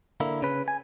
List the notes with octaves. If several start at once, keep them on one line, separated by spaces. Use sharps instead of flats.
D3 A#3 E4
C#3 C#4 B4
G#5